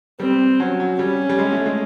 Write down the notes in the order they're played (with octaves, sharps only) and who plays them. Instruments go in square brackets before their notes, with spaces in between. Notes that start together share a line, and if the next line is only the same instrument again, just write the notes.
[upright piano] G3 [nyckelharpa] C4
[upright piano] F#3 [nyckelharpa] C#4
[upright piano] F#3
[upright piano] G3 [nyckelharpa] C#4
[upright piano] G3
G#3
A3
G#3